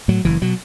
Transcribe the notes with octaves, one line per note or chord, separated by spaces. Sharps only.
A2 F#3
F#1 E3
B2 F#3